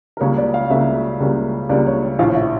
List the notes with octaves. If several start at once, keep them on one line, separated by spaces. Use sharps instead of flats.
A#4
C#2 C#3 G3 A#3 C#5
D5
F5
C#2 C#3 G3 A#3 E5
C#2 C#3 G3 A#3
C#2 C#3 G3 A#3 D5
C#5
A#1 A2 F3 F5
E5